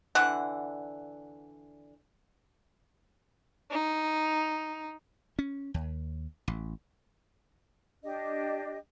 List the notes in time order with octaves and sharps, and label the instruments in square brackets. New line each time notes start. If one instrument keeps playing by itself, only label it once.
[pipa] D3 E3 F#5
[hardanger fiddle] D#4
[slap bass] C#4
D#2
A1
[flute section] D4 G4 D#5